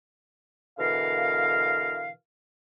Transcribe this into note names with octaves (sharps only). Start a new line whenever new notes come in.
B2 D3 E3 A#4 F5